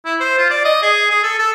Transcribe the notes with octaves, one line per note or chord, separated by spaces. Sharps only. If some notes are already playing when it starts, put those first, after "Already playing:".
E4
C5
F4
D5
D#5
G#4
G#4
A4
A4